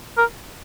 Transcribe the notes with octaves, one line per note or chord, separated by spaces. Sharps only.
A#4